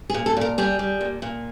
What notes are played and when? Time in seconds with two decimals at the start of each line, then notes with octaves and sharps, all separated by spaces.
0.10 G#4
0.14 A#2
0.26 A4
0.37 A#2 A#4
0.58 G3 G#4
0.79 G3
1.01 A#2
1.22 A#2